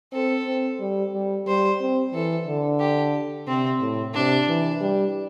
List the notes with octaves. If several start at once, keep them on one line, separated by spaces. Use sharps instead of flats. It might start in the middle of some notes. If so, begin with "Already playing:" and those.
C4 A4
C4
G3
G3
G3 C5
C4
E3 A4
D3
G4
C3 C4
A2
C3 D4
E3
G3